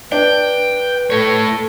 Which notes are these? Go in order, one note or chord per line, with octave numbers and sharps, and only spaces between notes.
D4 B4 G5
A2 A4 C#5